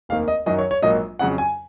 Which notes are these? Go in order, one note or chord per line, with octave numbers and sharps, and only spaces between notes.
F1 D#2 D#3 A#3 F5
D#5
F#2 D#3 F#3 D#5
C#5
C#5
A#1 G#2 F#3 A#3 D#5
F2 C#3 F#3 F#5
G#5